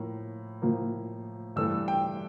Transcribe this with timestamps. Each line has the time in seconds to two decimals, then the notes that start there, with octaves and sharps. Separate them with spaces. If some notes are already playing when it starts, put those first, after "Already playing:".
Already playing: A2 F3 A#3
0.62 A2 F3 A#3
1.56 G2 E3 A3 E6
1.88 G5